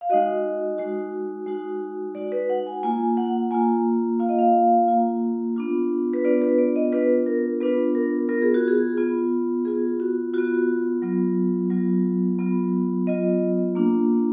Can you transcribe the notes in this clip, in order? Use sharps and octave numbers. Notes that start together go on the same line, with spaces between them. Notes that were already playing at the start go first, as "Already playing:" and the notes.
F5
G#3 D#4 F#4 D#5
G#3 D#4 F#4
G#3 D#4 F#4
G#3 D#4 F#4 D5
B4
F#5
G#5
A#3 F4 G#5
F#5
A#3 F4 G#5
A#3 F4 F5
D#5
F5
A#3 F4
B3 D4 F4
B4
B3 D4 F4 D5
B4
D5
D#5
B3 D4 F4 B4
A#4
B3 D4 F4 B4
A#4
B3 F4 A#4
G#4
F#4
G#4
B3 F4
B3 F4 G#4
F#4
B3 F4 F#4
F#3 B3 F4
F#3 B3 F4
F#3 B3 F4
F#3 B3 F4 D#5
A#3 D4 F4